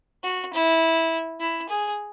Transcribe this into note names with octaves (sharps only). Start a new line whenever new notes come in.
F#4
E4
E4
G#4